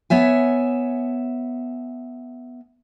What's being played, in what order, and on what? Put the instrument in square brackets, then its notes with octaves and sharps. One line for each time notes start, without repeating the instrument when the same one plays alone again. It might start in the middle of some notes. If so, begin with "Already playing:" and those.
[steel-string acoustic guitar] B3 C#5 E5 G#5